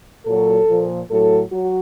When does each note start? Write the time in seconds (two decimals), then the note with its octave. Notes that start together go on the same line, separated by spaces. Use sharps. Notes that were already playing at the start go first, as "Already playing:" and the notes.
0.26 A#2 F#3 A4
0.68 A#2 F3
1.09 A2 F#3 A4
1.51 F#3 F#4